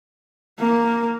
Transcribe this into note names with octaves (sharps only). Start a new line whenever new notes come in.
A#3